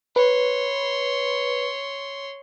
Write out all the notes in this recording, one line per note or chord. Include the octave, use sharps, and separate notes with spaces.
B4 C#5 C6